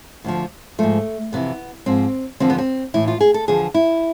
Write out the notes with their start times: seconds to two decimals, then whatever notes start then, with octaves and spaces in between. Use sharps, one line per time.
0.24 D2 D3 F3
0.78 G#2 F3 A3
1.32 F2 C3 E3 B3
1.86 G#2 F3 C4
2.40 E2 D3 F3 C4
2.50 B3
2.58 C4
2.94 A2 E3 E4
3.08 F4
3.21 G#4
3.34 A4
3.48 E2 D3 F3 G#4
3.74 E4